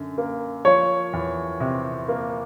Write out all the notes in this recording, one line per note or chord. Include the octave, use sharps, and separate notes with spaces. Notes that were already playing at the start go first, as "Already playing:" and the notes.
Already playing: F#2 D3
A#3
F3 C#5
E2
C3
A#3